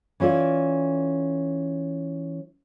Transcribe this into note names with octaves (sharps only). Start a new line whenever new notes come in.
E3 C#4 F4 A4 D5